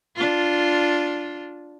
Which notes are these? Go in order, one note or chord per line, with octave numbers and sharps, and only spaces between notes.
D4 F4